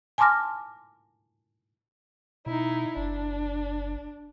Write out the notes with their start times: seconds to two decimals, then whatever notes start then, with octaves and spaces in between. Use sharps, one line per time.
0.18 G#5 A5 C6 D6 F6 A#6
2.46 B2 D#4 E4
2.97 F#1 D4